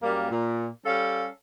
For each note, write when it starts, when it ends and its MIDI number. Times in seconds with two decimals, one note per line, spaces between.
0.02 0.30 42
0.02 0.30 55
0.02 0.30 58
0.30 0.69 46
0.86 1.27 55
0.86 1.27 61
0.86 1.27 69
0.86 1.27 77